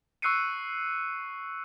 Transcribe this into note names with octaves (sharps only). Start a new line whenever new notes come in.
C#6 E6 F#6 C7 C#7 D#7